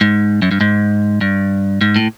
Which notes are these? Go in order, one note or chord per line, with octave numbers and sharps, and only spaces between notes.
G#2
F#2
G2
G#2
G2
G#2
A2